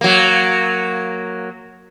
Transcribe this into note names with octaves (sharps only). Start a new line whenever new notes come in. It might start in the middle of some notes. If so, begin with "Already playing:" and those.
F#3 A#3